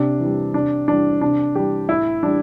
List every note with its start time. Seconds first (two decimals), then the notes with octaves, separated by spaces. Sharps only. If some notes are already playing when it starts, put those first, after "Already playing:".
Already playing: C3 D4
0.20 E3
0.25 G3
0.54 C3 D4
0.88 E3 G3 D4
1.21 C3 D4
1.55 E3 G3 G4
1.89 A2 E4
2.23 E3 G3 D4